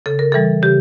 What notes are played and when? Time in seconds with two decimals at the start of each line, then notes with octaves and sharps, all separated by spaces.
0.06 C#3 A4
0.19 A#4
0.32 E3 G3 A4
0.63 C#3 G4